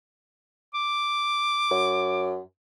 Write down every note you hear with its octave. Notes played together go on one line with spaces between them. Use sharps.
D6
F#2